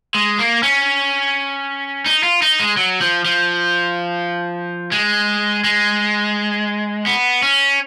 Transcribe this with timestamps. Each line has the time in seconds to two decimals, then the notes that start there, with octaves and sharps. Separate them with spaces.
0.14 G#3
0.39 A#3
0.63 C#4
2.06 D#4
2.23 F4
2.42 D#4
2.60 G#3
2.77 F#3
3.01 F3
3.25 F3
4.92 G#3
5.64 G#3
7.06 B3
7.43 C#4